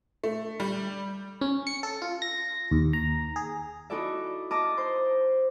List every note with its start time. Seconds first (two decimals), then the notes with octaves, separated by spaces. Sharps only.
0.24 A3
0.60 G3
1.41 C#4
1.67 C#7
1.83 A4
2.02 F4
2.22 A#6
2.71 D#2
2.93 A#5
3.36 G#4
3.90 D#4 E4 F#4 A4 D5 E5
4.51 D#5 A5 A#5 D6 D#6 F6
4.77 C5 C6